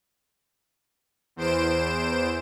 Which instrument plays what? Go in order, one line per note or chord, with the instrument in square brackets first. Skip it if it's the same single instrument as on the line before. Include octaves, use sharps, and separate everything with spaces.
[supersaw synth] E2 C5 D7 E7